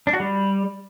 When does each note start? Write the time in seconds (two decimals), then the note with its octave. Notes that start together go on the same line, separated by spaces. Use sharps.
0.07 D4
0.13 F#4
0.20 G3